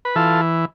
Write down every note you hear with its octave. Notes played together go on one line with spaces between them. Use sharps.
B4
E3 F4 A4